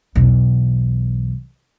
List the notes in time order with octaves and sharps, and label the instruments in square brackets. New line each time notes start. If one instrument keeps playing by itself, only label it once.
[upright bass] B1 E2